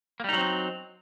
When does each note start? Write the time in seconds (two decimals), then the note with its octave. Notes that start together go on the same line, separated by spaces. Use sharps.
0.20 A#3
0.24 G3
0.29 D#4
0.33 F#3
0.37 C4